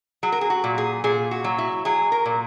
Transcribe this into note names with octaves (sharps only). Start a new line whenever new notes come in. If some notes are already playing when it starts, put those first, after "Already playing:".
F#3 G#4
A#4
G#4
F#4
A#2
G#4
A#2 G#4
F#4
F#3
E4
F#3 G#4
A#4
A#2